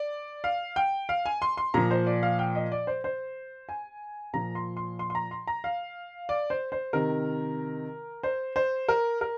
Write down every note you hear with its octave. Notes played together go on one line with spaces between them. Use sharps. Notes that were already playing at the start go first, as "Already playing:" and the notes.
Already playing: D5
F5
G5
F5
G#5
C6
C6
A#2 F3 A#5
C5
D5
F5
G5
D#5
D5
C5
C5
G#5
A#2 F3 A#5
C6
C6
C6
C6
A#5
C6
A#5
F5
D5
C5
C5
C3 D#3 A#4
C5
C5
A#4
A#4